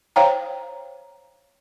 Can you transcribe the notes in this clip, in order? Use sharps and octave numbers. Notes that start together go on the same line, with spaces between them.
C5 C#5 F5 G5 A#5